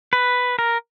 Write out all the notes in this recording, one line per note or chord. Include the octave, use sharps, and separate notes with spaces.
B4
A#4